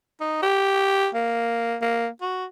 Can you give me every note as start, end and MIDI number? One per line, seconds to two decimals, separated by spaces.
0.21 0.39 63
0.42 1.08 67
1.14 1.76 58
1.82 2.08 58
2.21 2.45 66